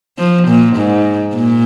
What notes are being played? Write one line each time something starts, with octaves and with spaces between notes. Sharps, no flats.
F3
A#2
G#2
A#2